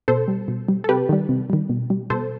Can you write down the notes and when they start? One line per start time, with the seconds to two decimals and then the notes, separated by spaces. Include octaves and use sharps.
0.08 B2 A4 C5
0.28 G3
0.48 B2
0.68 G3
0.84 A4
0.89 C3 G4 B4
1.09 D#3 G3
1.29 C3
1.50 D#3 G3
1.69 B2
1.90 G3
2.10 B2 A4 C5